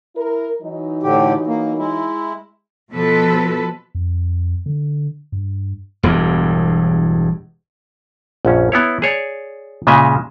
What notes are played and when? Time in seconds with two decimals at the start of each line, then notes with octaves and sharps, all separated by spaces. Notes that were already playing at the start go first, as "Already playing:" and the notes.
0.16 E4 A#4
0.62 E3 F#3 D#4
1.03 A2 D3 G4
1.47 A#3
1.78 G#3 E4
2.91 B2 F3 A4 B4
3.95 F2
4.66 D3
5.32 G2
6.03 E1 E2 G2
8.45 A#1 F#2 C#4
8.72 B3 E4 C#5
9.02 G#4 C#5 D5
9.87 A#2 C#3 G#3 D#5 E5